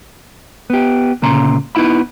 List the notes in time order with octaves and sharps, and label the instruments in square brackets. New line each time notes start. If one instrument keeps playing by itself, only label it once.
[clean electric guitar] B3 G4
D2 A#2 C#3 C#4 A#5 C6
B3 D#4 E4 F5 B5